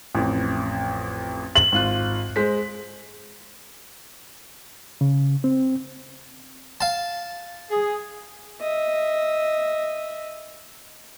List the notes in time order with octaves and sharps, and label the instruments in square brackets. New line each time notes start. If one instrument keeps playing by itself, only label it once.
[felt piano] A1 F2
[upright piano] F#7
[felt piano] G#1 F4 F#6
G#3 C5 B6
[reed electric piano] C#3
C4
[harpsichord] F5 A5
[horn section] G#4
[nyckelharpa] D#5 E5